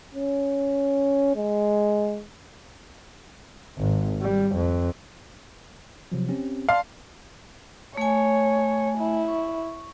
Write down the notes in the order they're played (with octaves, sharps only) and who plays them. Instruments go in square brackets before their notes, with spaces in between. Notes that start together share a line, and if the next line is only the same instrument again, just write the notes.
[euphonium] C#4
G#3
[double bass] G#1
G3
F2
[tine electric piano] C3 F3 F#3
C4 C#4 G4
[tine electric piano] D5 A5 C6 [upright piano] F5
[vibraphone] A3 G#5 [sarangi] C#5
[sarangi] E4
[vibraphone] C#6